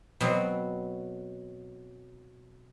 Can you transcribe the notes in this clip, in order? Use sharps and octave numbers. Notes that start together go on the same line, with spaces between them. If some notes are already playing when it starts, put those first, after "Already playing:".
B2 F#3 C4